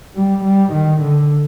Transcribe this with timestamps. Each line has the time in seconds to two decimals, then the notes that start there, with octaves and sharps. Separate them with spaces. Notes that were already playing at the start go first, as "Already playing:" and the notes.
0.16 G3
0.44 G3
0.73 D#3
1.01 D3